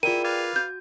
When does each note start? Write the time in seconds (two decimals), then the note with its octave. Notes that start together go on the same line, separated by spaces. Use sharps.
0.03 E4 F4 G#4 A#4 D5 G5 D#7
0.24 B4 F5 D6 G#6 A6
0.56 F#4 G6